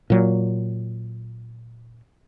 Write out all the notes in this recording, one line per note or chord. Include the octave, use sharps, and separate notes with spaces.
A#2 F#3